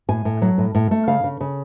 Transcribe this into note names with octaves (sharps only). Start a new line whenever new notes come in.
A2 G#5
A2
F#3
A2
A2
A3
C#3 F5
C#3
C#3